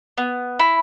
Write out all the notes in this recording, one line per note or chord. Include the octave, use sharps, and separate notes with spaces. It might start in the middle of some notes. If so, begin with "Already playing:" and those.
B3
E4